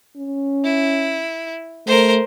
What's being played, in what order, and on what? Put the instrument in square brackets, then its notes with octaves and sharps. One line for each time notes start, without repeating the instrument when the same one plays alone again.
[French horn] C#4
[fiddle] E4
[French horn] A3 [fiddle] A#4 C5